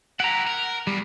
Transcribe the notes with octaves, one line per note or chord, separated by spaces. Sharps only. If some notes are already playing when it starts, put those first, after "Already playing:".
E4 G4 F#5 A#5
A#4
E2 G3